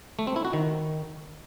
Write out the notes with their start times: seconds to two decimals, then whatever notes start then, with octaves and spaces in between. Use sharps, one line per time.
0.19 A3
0.27 C4
0.36 E4
0.45 F#4
0.53 D#3